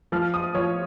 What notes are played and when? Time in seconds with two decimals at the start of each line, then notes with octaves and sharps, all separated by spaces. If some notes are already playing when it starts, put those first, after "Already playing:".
0.12 F3 F6
0.34 D#6
0.55 F3 C#5